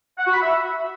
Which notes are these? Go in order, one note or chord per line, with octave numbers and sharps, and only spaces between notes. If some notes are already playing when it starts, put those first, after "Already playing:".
F#5
F#4
B5
E5